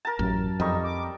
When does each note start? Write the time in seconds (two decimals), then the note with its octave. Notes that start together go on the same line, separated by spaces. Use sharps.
0.05 A#4 A5
0.19 A1 F#2
0.60 F2 G3 D#4 C#6
0.84 D6